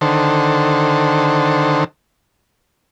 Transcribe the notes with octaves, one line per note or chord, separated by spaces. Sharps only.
D3 D#3 A4 C5